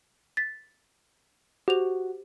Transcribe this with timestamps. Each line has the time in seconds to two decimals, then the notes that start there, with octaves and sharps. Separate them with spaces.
0.37 A6 B6
1.68 F#4 G4 C5 F7